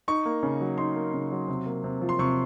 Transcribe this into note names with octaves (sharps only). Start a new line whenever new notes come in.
D#4 C#6
A#3
C#3
F#3
D#4 C6
A#3
C#3
F#3
C3
A#3
C3
F3
C6
C3 C#6